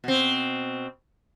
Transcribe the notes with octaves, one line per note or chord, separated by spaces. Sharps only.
B2 C4